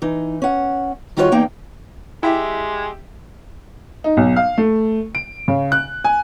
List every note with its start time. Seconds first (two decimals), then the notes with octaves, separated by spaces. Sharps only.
0.02 E3 D#4
0.42 C#4 F#5
1.17 D#3 G3 F4 F#4 A4 C#5
1.32 E2 A#3 D#4 G5
2.23 G#3 E4 G4 E5 G5
4.04 D#4
4.17 B1
4.36 F5
4.58 A3
5.15 D7
5.48 C#3
5.72 F#6
6.04 G#5